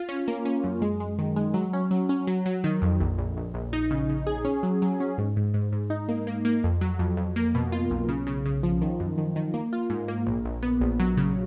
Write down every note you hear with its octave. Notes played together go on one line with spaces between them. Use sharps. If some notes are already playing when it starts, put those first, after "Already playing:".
Already playing: F4
C#4
A#3
C#4
F#2
G#3
G#3
D#3
G#3
F#3
C#4
F#3
C#4
F#3
F#3
D#3
F2
A#1
A#1
A#1
A#1
D#4
C#3
C#3
G#4
C#4
F#3
F#3
C#4
G#2
G#2
G#2
G#2
D#4
A#3
A#3
A#3
F2
F#3
F2
F2
A#3
B2
F4
B1
C#3
C#3
C#3
F3
D#3
F#2
D#3
D#3
A#3
F4
G#2
A#3
A#1
A#1
B3
A#1
F#3
C#3